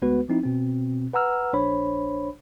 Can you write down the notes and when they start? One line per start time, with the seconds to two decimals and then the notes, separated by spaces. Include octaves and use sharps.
0.02 D2 G#3 B3 F#4 B4
0.29 F3 C4 D#4 E4
0.43 B2 C4
1.13 B4 F#5 A#5 E6 F6
1.53 A#1 D4 C5 C#5 B5